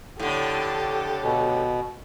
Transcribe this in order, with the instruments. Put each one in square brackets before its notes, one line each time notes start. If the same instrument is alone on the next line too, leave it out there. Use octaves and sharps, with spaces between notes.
[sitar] A2 D3 [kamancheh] G4 A4
[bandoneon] B2